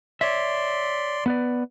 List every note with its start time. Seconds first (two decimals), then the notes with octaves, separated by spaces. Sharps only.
0.21 C#5 D5 E5 C6
1.26 B3 B4 D5